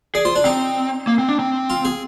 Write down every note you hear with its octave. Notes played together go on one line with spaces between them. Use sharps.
G#4 D5
F4 C5
D4
C4 D#4
A#3
C4
D4
C4
F4
G#4